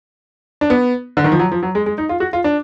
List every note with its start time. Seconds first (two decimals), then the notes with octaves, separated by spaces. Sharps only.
0.61 D4
0.70 B3
1.17 D3
1.24 D#3
1.32 F3
1.39 F#3
1.52 F3
1.63 F#3
1.75 G#3
1.86 G#3
1.98 D#4
2.09 F4
2.20 F#4
2.33 F4
2.44 D4